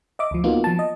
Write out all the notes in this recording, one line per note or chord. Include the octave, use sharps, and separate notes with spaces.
D#5 E5 D6
D2 F3
A#3 B3 D#4 F4 F#4
F3 A5
D#5